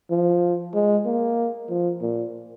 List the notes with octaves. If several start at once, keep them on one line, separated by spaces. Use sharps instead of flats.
F3
G#3
A#3
F3
A#2